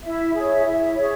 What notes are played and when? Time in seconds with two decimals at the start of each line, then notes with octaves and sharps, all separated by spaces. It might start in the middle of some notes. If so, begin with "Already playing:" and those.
0.04 E4 E5
0.34 G#4 C#5 E5
0.65 E4 E5
0.96 G#4 C#5 E5